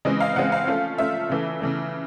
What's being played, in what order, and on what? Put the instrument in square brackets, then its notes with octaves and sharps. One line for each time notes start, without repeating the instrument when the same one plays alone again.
[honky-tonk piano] C#3 E3 G#3 C4 D#5
F5
C#3 E3 G#3 C4 F#5
F5
F3 A3 C#4 F4
F3 A3 C#4 F4 E5
C#3 E3 A3
C#3 E3 A3